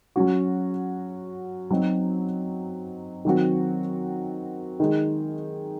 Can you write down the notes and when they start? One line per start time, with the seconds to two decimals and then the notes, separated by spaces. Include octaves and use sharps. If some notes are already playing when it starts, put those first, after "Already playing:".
0.16 F#3 C#4 F#4
1.71 F#3 C4 D#4 F#4
3.25 D#3 F#3 C4 F#4
4.80 D#3 G#3 D#4